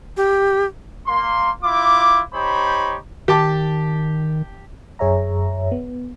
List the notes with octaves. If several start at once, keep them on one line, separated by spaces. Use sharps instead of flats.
G4
A#3 C6
E4 F4 D6
D#4 G4 C5 C#5 B5
D#3 G4 A5 D6
F#2 G#4 C#5 E5 A#5
B3